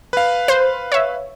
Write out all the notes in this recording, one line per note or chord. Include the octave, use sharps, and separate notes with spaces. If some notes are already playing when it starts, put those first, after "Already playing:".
B4 F5
C5
C#5 E5